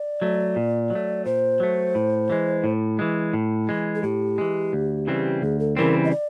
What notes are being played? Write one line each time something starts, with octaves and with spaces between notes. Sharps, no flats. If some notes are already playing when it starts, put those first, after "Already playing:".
Already playing: D5
F#3 A3
A#2
F#3
A3
A#2 C5
F#3 A3
A2
E3 G#3
A2
E3 G#3
A2
E3 G#3
G#4
A2 G4
E3 G#3
D2
C#3 E3 G3 C4
D2 G#4
A4
C#3 E3 G3 C4 A#4
D#5
D5